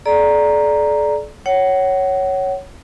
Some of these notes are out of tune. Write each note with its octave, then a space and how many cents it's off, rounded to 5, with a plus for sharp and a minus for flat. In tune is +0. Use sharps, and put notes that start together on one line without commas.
A4 -45 D5 +0 A#5 +0
C#5 +0 F#5 +30